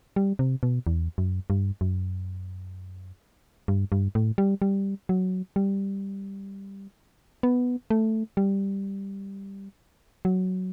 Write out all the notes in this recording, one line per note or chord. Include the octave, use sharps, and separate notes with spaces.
G3
C3
B2
E2
F#2
G2
F#2
G2
G2
A2
G3
G3
F#3
G3
B3
A3
G3
F#3